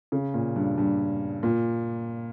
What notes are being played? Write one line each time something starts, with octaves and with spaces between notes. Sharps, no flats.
C#3
A#2
G2
G2
A#2